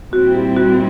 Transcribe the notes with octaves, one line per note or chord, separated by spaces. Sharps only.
A#2 G3 C4 E4 F#4
G4
F#4